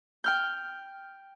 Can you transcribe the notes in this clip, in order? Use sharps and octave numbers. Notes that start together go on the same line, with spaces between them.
G5 F6 G6